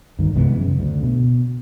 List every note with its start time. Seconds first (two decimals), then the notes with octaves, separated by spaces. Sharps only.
0.19 D2 G2 D#3
0.36 C3 E3 G#3 B3
0.55 F#2 C#3
0.79 D2
1.03 B2